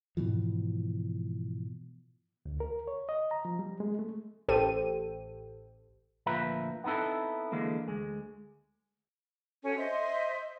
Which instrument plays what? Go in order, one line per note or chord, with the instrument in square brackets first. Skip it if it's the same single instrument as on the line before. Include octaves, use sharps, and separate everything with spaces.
[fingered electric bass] G#2 B2 E3 F3
[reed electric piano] D2
A#4
C#5
D#5
A#5
F3
G3
G#3
A3
[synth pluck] A1 G4 A4 C5 G5 D#7
[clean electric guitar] D2 A#2 F3 B4 E5 A#5
B3 C4 D#4 E4 A4
D3 E3 G#3 A#3
D2 G#3
[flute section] C#4 F#4 A4
C5 D#5 E5 C6